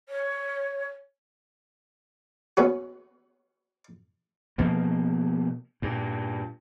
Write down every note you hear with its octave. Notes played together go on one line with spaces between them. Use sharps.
C#5
B3 C#4 F#4
B2 F3 A#3
G2 A#2